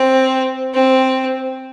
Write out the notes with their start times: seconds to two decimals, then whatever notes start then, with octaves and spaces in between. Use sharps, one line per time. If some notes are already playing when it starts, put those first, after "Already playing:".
Already playing: C4
0.74 C4